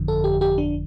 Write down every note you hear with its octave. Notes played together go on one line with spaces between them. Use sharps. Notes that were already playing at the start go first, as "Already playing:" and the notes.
Already playing: G1 F2 D3 F3
A4
G4
G4
D4